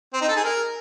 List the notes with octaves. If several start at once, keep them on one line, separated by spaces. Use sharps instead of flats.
C4
D#4
A4
G#4
A#4